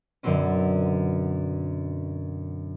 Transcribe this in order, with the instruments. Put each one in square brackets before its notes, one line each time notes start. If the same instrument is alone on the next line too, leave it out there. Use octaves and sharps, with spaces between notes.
[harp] F#2 B2 D3 F#3 C4 C#4